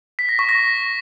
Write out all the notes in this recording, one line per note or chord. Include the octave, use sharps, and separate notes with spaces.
B6
A#6
C#6
A#6